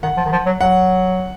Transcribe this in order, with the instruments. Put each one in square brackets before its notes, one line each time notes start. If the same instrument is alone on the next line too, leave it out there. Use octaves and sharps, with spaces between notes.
[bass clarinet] D#3 [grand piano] F#5
[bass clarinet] F3
D#3
F3
F#3
[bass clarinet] F#3 [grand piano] F#5